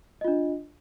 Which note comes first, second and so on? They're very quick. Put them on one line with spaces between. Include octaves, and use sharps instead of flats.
D#5 F4 D4